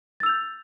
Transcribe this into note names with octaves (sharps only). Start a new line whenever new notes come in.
E6 G6 A6 F7